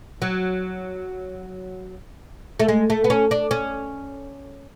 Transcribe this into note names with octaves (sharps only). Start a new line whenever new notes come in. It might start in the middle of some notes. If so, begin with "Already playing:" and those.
F#3
A3
G#3
A3
B3
C#4
D4
C#4